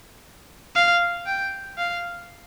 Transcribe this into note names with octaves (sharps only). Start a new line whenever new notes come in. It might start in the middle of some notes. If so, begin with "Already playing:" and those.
F5
G5
F5